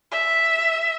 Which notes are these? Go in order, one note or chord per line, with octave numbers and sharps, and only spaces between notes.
E5